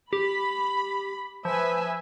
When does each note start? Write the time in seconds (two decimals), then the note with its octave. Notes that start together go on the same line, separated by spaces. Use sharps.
0.13 G4 B5
1.45 F3 B4 E5 G#5